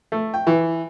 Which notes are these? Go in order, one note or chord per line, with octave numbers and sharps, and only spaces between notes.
A3
G5
E3